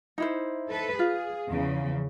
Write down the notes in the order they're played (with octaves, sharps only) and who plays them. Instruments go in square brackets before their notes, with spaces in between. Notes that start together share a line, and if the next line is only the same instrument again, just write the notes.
[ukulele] D#4 E4 C5
[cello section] A4 B4
[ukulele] F4 [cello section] G#4
[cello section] E2 C#3 F3